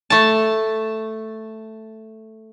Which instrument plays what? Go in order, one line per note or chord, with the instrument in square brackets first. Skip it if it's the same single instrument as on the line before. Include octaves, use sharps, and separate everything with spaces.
[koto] A3 A5